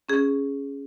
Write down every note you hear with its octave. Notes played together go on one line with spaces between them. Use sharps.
C#4 G#4